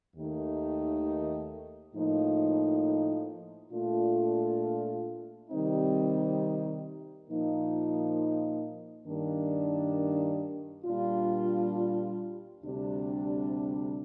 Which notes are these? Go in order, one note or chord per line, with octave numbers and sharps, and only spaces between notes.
D#2 D#3 A3 D#4
A2 F3 A#3 D#4
A#2 A3 D4 F4
C3 D#3 G3 C4 D#4
A#2 F3 A#3 D#4
G2 D#3 A#3 D4
A#2 G3 D4 F4
D2 C3 G3 D4